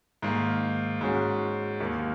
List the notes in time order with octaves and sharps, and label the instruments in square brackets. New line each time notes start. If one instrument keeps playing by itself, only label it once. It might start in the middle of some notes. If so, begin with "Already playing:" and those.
[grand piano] G#2 D#3 A#3
G#2 G#3 C#4 F#4
D#2 D#3 A#3